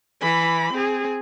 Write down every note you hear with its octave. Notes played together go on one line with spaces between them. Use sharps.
E3 B5
C4 G#4